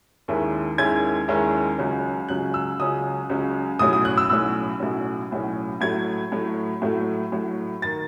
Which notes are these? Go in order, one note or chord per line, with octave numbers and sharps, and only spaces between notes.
D#2 D#3 G#3 C#4 E4
D#2 D#3 G#3 C#4 E4 G#6
D#2 D#3 G#3 C#4 E4
C#2 C#3 F#3 C#4
C#2 C#3 F#3 C#4 F#6
E6
C#2 C#3 F#3 C#4 D#6
C#2 C#3 F#3 C#4
B1 A2 F#3 C#4 D#6
D#6
F#6
E6
B1 A2 F#3 C#4 E6
B1 A2 F#3 C#4
B1 A2 F#3 C#4
A2 F#3 A3 G#6
A2 F#3 A3
A2 F#3 A3
A2 F#3 A3
D#3 A6